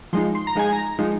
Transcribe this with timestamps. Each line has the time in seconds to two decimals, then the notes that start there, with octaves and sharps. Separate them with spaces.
0.13 F3 G#3 D#4 C6
0.35 C6
0.47 A#5
0.55 F3 G#3 D#4 G#5
0.72 A#5
0.99 F3 G#3 D#4